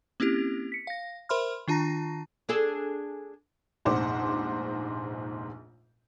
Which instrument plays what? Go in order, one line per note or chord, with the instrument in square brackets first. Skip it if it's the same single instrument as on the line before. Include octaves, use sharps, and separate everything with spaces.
[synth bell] A#3 C4 C#4 E4 G4
B6 C#7
F5 A#6
A#4 C5 E5 B5 C6 F6
D#3 D4 F4 A5 A#5 A#6
[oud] D4 G#4 A4
[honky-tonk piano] F1 A#1 G#2 C5 F#5 D6